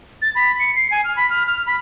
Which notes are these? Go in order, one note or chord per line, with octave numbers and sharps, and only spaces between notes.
A6
B5
C#7
C7
G#5
F6
B5
F6
F6
B5